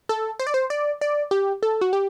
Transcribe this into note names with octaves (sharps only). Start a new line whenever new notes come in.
A4
C5
D5
C5
D5
D5
G4
A4
F#4
G4